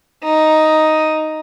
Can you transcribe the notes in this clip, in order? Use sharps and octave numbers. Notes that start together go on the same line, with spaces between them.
D#4